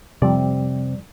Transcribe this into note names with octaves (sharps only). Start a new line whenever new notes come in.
F2 C3 G3 C4 D5